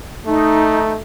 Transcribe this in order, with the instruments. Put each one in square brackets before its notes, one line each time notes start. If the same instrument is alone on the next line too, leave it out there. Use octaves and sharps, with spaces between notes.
[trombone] A3 [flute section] D#4